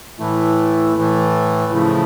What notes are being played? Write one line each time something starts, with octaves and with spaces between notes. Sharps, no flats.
A2 E3 A3 E4
A2 E3 A3
C#3 F3 A3 E4